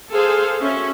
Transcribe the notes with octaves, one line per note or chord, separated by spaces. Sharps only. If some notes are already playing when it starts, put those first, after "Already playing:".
G#4 A4 C5 F5
C#4 F#4 E5